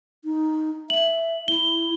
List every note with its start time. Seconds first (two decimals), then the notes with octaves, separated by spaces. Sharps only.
0.25 D#4
0.90 E5 F#7
1.48 E4 G7